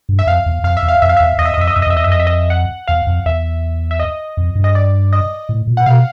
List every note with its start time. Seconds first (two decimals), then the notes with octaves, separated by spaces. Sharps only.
0.09 G2
0.19 E5
0.27 F2 F5
0.46 E2
0.64 F2 F5
0.77 E5
0.83 E2
0.88 F5
1.02 F2 E5
1.09 F5
1.17 E5
1.20 E2
1.38 E2 D#5
1.46 E5
1.54 D#5
1.57 F2 E5
1.67 D#5
1.76 F2 E5
1.82 D#5
1.86 F2
1.90 E5
1.95 E2 D#5
2.04 F#2 E5
2.12 F2 D#5
2.20 E5
2.27 D#5
2.50 F#5
2.87 E2 F5
3.07 F2
3.26 E2 E5
3.91 E5
4.00 D#5
4.37 F2
4.55 G2
4.64 D#5
4.75 D5
5.13 D#5
5.49 A2
5.67 A#2
5.77 F#5
5.86 B2 F5